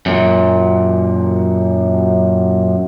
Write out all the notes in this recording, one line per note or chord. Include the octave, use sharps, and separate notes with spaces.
F#2 A#2